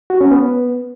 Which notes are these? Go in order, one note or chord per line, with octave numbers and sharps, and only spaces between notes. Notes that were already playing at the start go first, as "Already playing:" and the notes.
F#4
C#4
B3